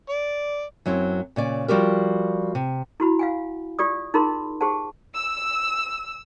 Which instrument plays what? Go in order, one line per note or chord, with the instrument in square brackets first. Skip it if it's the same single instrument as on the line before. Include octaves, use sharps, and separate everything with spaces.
[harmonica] D5
[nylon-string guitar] F#2 F#3 C4 E4
A#2 C#3 D5
F3 G3 F#4 G4 A#4
C3
[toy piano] E4 F#4 B5
F5 F#5 G#5
F4 G4 D5 D#6
D#4 F4 G#4 A#4 B5 C6
G4 G#4 C5 F#5 A5
[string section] E6